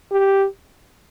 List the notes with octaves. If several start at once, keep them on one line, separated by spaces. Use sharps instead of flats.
G4